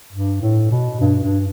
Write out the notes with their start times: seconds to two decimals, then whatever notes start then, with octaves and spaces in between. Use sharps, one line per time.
0.12 G2
0.42 A2
0.71 B2
1.01 G2
1.23 G2